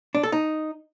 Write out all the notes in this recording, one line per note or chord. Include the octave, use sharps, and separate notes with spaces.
D4
A4
D#4